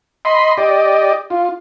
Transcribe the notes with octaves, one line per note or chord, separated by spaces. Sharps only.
D#5 B5 C6
G4 D5 D#5
F4